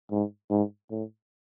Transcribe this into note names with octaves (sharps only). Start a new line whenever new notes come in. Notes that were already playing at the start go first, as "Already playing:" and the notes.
G#2
G#2
A2